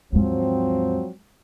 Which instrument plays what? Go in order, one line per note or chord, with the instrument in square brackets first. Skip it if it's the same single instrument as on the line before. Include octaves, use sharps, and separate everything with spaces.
[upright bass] D#2 G#2 [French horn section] F3 F#3 C4